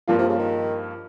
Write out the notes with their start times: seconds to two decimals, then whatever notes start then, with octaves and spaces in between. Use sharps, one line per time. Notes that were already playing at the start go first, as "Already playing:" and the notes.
0.08 G2 A#2 F3 A#3 F4
0.18 C3
0.29 C#3
0.38 D#3